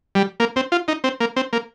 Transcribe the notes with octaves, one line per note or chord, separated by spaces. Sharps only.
G3
A#3
C4
F4
D#4
C4
A#3
C4
A#3